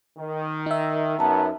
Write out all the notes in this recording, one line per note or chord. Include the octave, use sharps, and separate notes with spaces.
D#3
D#4 E5
F#2 B3 A5 A#5